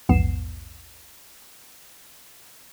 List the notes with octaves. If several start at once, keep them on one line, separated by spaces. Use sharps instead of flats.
A#1 E2 G#2 B3 C7 E7